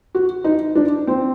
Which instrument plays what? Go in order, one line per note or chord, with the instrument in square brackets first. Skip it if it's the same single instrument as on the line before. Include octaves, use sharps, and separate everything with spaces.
[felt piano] F#4
D#4
D4
C4